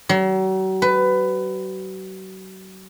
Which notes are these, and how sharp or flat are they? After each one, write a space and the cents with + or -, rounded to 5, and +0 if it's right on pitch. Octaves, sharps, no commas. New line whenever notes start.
F#3 +40
B4 +20